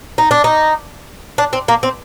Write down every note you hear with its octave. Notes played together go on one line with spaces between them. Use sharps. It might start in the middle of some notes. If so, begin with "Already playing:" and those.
D#4
D4
D#4
D4
C4
A#3
C4